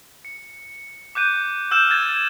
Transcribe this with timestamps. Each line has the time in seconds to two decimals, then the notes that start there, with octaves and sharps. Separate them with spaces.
0.25 C#7
1.15 D6 F#6 G6 D#7
1.71 E6 F6 G6 E7
1.91 G#6 A6